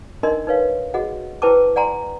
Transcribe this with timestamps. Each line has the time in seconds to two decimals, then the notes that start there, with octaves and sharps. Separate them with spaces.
0.23 D4 D#4 A#4 D#5 C6
0.47 D#4 B4 C#5 F5
0.94 F#4 G#4 D#5 F#5
1.42 E4 B4 C5 G5 A5 D6
1.76 D5 F#5 G#5 A#5 C6